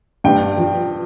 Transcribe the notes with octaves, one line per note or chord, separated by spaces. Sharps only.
G2 G5
F3